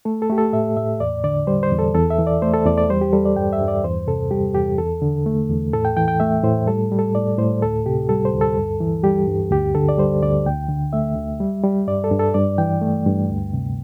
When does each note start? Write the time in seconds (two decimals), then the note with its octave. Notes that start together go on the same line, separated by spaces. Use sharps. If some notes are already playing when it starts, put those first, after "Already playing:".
0.05 A3 A4
0.22 A4
0.30 A3 G4
0.38 A4
0.53 A2 E5
0.76 A2 E5
1.00 E2 D5
1.24 D3 D5
1.47 G3 C5
1.63 C5
1.71 E2
1.79 A4
1.94 E2 A4
2.10 E5
2.19 E3
2.27 D5
2.42 A3 C5
2.54 A4
2.66 E2 D5
2.78 D5
2.90 G3 C5
3.01 G4
3.13 G3 A4
3.25 D5
3.36 G2 G5
3.53 E5
3.61 G2
3.68 D5
3.84 E2 C5
4.07 C3 A4
4.31 G3 G4
4.54 E2 G4
4.78 E2 A4
5.02 D3
5.26 A3
5.50 E2
5.73 A2 A4
5.85 G5
5.97 E3 G5
6.08 G5
6.20 A3 E5
6.44 A2 C5
6.67 G3 A4
6.92 G3
6.99 A4
7.15 A2 D5
7.38 A2 C5
7.62 D2 A4
7.86 C3 G4
8.09 G3 A4
8.25 C5
8.33 D2
8.41 A4
8.57 G2
8.80 E3
9.04 G3 G4
9.27 G2
9.51 D2 G4
9.75 D3 A4
9.89 D5
9.98 G3 C5
10.22 D2 D5
10.46 D2 G5
10.69 D3
10.93 A3 E5
11.16 D2
11.40 G3
11.64 G3
11.88 G2 D5
12.04 A4
12.11 G2
12.19 A4
12.34 G2 D5
12.58 E3 G5
12.82 A3
13.06 G2
13.30 D2
13.53 C3